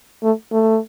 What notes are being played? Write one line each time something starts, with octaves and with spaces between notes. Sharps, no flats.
A3
A3